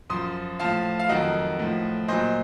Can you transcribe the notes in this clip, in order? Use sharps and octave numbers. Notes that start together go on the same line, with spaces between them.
F#2 F3 C6 D#6
A2 F3 F5 A5
F5
F2 D#3 F#3 D#5 F#5
A2 F3
A#2 F#3 C5 D#5